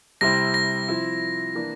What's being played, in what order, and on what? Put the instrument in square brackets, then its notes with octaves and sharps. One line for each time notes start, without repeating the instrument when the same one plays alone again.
[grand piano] C3 G3 C4 E4 [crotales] A#6
[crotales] A#6
[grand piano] F3 C4 E4
E3 A#3 D4